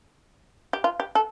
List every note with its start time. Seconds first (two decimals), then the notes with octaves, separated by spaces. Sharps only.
0.73 G4
0.84 F4
1.00 G4
1.15 A4